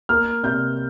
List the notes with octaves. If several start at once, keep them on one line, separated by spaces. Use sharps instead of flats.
A#3 F6
C3 G6